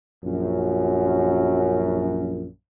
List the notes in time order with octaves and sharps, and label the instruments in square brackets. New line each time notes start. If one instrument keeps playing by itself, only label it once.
[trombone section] A#1 F#2